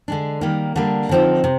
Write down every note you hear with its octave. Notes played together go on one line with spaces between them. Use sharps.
D3 G#3 D4
D#3 G3 A#3
D3 G3 A#3 D4
D3 F3 C4 D#4
C3